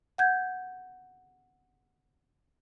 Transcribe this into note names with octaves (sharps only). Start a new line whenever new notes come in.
F#5 G6 G#6